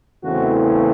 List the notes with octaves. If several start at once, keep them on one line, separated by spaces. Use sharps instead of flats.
E2 C#3 E3 A3 C4 F#4